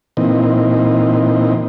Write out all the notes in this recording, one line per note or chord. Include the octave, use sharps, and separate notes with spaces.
A#2 E3 C4 D#4